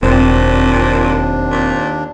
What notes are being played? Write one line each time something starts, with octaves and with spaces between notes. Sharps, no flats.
E1 D#2 A#2 C4 D4
A#2